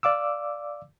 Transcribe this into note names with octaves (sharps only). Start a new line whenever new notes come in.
D5 F5 D6 E6